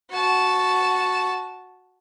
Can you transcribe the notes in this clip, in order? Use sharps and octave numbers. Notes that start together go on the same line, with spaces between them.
F#4 A5